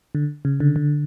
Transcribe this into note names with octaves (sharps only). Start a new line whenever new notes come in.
D3
C#3
D3
D3